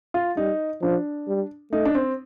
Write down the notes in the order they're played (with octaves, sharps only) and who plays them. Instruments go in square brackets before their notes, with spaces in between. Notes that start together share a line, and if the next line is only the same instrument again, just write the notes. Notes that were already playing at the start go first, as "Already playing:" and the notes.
[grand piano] F4
[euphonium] G3 [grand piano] D#4
[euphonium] F3 [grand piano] D4
[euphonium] G3
[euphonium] A3 [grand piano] D#4
[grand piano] D4
C4